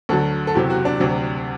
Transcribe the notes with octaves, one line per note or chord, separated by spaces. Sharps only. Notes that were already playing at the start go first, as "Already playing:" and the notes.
D2 D3 F#3 A4
A4
F#1 E2 C3 F#3 G4
F#4
D4
D2 C3 F#3